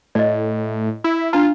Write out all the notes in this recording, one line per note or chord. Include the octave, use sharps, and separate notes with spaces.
A2 D5 D#5
E4
D4 F4 A#5